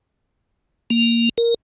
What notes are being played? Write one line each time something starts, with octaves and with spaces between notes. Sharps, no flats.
A#3
A#4